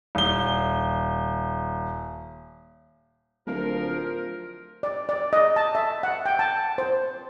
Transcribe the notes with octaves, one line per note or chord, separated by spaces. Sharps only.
D#1 G7
D1 F3 A#4
D5
D5
D#5
A5
E5
F#5
G5
A5
C5